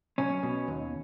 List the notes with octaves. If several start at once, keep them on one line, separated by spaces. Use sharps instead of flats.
B1 C#4
B2
D#2